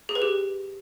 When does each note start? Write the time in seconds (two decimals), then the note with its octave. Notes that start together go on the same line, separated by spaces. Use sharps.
0.09 G#4
0.15 B4
0.22 G4